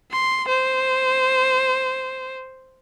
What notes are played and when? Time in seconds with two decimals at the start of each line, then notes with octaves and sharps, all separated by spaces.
0.11 C6
0.48 C5